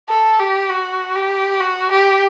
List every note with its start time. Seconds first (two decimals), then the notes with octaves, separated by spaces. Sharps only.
0.09 A4
0.39 G4
0.70 F#4
1.15 G4
1.60 F#4
1.91 G4